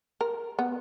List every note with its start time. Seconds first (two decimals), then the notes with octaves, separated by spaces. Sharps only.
0.21 A#4
0.59 B3